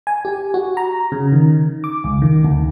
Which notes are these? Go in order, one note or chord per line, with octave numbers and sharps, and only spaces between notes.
G#5
G4
F#4
A#5
C#3
D#3
D6
C#2
D#3
D2